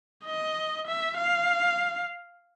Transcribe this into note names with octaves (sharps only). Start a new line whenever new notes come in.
D#5
E5
F5